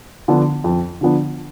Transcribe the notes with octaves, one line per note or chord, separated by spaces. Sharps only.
D3 F3 B3 D4
F2
D3 F3 B3 D4